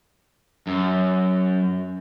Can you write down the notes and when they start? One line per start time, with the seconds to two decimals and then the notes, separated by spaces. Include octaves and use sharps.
0.67 F#2